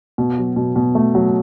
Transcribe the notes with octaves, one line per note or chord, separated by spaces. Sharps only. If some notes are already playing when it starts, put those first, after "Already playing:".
B2
F#3
B2
B2
A3
F#3